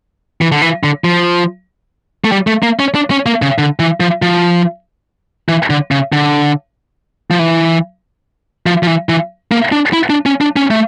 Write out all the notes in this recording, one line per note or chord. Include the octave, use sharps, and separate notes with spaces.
E3
D3
E3
D3
F3
A3
G3
A3
A#3
C#4
D4
C#4
A#3
C#3
D3
E3
F3
F3
E3
D3
C#3
D3
F3
E3
F3
F3
E3
E3
A#3
D4
E4
D4
C#4
D4
C#4
A3